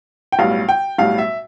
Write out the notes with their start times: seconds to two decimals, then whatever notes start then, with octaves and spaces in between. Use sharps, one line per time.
0.32 G5
0.39 B1 A2 G3 F5
0.69 G5
0.98 B1 A2 G3 F5
1.18 E5